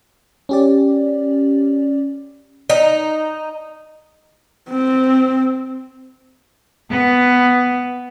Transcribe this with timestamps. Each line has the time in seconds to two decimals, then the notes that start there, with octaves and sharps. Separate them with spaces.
0.49 C#4 G4 D5
2.70 D#4
4.70 C4
6.90 B3